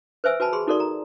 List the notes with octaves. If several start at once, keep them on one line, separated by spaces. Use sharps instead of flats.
B4 C5 E5 G#5 E6
F#4 B4 G#5 A5 B5
G4 G#4 B5 C6
D#4 F#4 A4 A#4 D5 C6
A#5